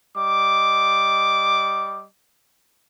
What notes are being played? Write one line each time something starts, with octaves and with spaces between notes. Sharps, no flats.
G3 D#5 D6